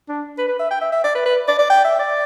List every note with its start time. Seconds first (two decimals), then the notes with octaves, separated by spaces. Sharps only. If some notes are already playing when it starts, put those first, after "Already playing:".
0.08 D4
0.38 B4
0.48 B4
0.59 E5
0.71 G5
0.81 E5
0.92 E5
1.04 D5
1.15 B4
1.26 B4
1.48 D5
1.59 D5
1.70 G5
1.84 E5
1.99 D5